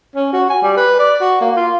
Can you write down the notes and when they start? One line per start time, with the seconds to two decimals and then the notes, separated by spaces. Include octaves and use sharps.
0.15 C#4
0.33 F#4
0.50 G#5
0.62 G3
0.77 B4
0.99 D5
1.21 F#4
1.41 A#3
1.56 F4